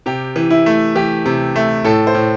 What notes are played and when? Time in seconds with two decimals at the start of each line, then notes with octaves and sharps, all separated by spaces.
0.06 C3 G4
0.36 E3
0.50 E4
0.66 A3
0.95 E3 G4
1.25 C3
1.56 A3
1.84 A2 A4
2.07 C5
2.15 A2